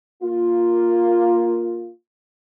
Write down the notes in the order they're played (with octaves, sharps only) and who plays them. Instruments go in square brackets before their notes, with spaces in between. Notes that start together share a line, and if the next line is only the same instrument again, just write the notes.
[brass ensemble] A#3 F4